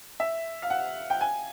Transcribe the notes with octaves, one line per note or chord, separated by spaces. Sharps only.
E5
F5
F#5
G5
G#5